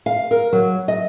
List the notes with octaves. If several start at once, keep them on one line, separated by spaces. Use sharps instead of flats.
F5
A#4
F#3
D#5